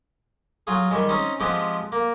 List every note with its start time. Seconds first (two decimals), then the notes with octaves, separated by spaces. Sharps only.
0.67 F#3 F4 G#4
0.91 D#3 G3 G#3
1.09 C4 C#4 D#4
1.40 F3 G#3 B3 C4 G4
1.92 A#3